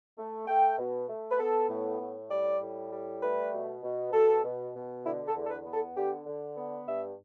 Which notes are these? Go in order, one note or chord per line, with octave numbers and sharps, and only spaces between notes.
A3
A3 G5
B2
A3
B4
B3 A4
A2
A2
G3 D5
A2
G3
A3 B4
B2
B2
B2 A4
B2
B2
D3 E4
A4
E2
A4
B4
B3
A4
D3 G4
D3
B3
G2 E5